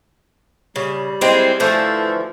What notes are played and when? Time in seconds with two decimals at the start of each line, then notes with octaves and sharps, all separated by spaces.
0.76 C#3 G3
1.21 G#3 C4 E4
1.60 D3 E3 F3 A3